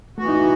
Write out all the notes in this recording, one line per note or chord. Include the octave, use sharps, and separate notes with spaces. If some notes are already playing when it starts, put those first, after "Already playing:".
E3 A3 B3 F#4
D#4
E4